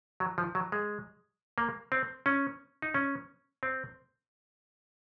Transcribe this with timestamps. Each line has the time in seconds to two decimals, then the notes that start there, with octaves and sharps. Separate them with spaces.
0.20 F#3
0.38 F3
0.55 F#3
0.72 G#3
1.58 A#3
1.92 C4
2.26 C#4
2.82 D#4
2.94 C#4
3.63 C4